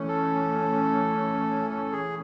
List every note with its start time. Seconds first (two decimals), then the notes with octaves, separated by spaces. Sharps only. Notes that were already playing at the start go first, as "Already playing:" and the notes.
Already playing: E3 A3 C#4
0.08 A4
1.71 A4
1.92 G#4